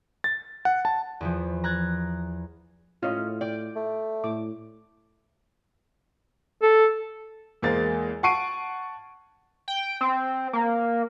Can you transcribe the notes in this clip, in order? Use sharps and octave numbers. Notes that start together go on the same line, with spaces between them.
A6
F#5
A5
E2 E3 F3
A#5 F#6 G#6 A6
A2 C#4 F4 D#5
D5 G5
A3
A2 D6
A4
E2 G#3 A#3 C5 A6
F#5 A5 C#6 C7 D7 D#7
G5
C4
A#3